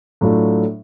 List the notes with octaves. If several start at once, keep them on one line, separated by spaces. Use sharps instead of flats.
A2 F#3 A3 D4 F4